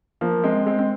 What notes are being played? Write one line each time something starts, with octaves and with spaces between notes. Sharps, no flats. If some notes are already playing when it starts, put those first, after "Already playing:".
F3 A#3
G#3 C4
G#3 C4
C4